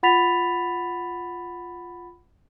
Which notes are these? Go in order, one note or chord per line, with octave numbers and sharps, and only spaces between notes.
F4 F#5 B5 A6 B6 F7